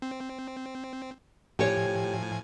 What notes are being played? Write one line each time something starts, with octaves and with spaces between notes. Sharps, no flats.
C4
A2 F3 G4 C#5 G#5